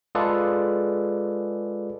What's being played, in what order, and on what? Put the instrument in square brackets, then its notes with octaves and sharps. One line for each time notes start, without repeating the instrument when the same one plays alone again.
[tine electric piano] G#3 F4 G#4 A4 B4 D5